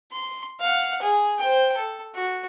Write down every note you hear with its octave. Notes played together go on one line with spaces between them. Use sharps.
C6
F5 F#5
G#4
C5 G5
A4
F#4